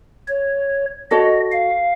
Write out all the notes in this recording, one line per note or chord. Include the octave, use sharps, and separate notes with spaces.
C#5
F#4 A4 C#5 D#5
F5